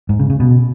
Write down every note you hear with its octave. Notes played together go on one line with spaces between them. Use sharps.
G#2
C#3
C#3
B2